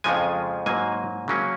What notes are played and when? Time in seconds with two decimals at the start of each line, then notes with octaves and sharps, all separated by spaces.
0.04 F2 C#3 F3 G#3 G#5
0.66 G#2 F#3 A#3 G#5
1.28 C#3 F#3 A#3 C#4